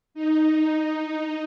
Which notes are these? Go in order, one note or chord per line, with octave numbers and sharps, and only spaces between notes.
D#4